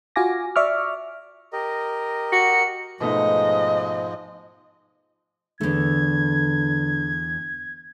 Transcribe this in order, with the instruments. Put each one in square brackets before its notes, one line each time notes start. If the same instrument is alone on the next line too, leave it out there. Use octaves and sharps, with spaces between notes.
[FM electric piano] F4 F#4 F5 G#5 D6 A#6
D5 E5 C#6 D6 F6
[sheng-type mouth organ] G4 A#4 D#5
[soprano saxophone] F#4 [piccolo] C#7
[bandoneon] G#2 F3 G#3 [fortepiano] B2 A3 D#4 [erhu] D#5
[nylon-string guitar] E2 A3 [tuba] D3 [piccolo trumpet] G#6